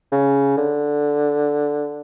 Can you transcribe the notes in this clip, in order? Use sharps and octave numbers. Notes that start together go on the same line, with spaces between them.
C#3
D3